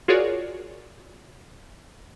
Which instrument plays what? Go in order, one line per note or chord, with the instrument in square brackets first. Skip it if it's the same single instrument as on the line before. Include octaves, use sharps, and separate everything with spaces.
[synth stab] F4 F#4 G#4 A#4 C#5 D5